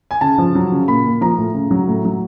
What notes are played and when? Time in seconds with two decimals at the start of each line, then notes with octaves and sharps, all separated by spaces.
0.11 G#5
0.21 C#3 A5
0.38 F3
0.55 F#3
0.72 C#3
0.88 A#2 B5
1.05 A#2
1.21 F3 A#5
1.38 A2
1.54 C#3
1.71 F#3
1.88 A2
2.05 F#3